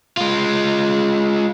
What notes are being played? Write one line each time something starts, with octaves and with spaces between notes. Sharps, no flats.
G#3 F4